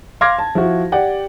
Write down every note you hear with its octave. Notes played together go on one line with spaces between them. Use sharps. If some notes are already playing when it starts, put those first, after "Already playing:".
F5 C6 D6 F6 G#6 A#6
A5
F3 E4 F#4
G4 D5 F#5 G5